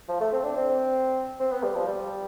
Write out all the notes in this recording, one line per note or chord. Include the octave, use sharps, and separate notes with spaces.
F3
A3
C4
D4
C4
C4
B3
G3
F3
G3